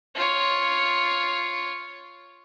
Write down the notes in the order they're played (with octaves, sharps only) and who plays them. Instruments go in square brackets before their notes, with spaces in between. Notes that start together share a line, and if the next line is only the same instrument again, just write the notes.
[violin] F4 C#5